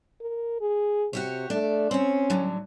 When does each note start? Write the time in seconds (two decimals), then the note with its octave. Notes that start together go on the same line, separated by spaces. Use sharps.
0.21 A#4
0.61 G#4
1.13 C3 F#4 G4 C#5
1.50 A3 D4
1.91 C4 C#4 C#5
2.30 A2 D3 F#3